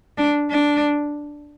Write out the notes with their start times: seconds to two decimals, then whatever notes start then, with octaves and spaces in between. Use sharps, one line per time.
0.17 D4
0.51 D4